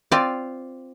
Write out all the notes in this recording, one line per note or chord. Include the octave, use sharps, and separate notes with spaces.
C4 F4 D5